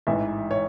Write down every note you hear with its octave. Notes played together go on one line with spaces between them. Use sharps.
A1 G#2 E3 E5
C#5